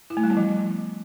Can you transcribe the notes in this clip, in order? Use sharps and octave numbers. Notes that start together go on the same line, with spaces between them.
E4
A3
G3
B3
F3